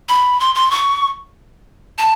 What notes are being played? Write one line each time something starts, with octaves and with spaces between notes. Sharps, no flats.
B5
C6
C6
C#6
A5